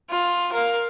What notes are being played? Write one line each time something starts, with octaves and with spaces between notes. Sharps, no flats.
F4
A#4 F5